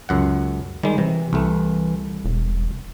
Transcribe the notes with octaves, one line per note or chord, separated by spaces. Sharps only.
C#2 F#2 F#5
D#3 G3 G#3
C3 E3
C2 A3
E1